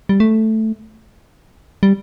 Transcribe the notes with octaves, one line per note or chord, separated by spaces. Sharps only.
G3
A3
G3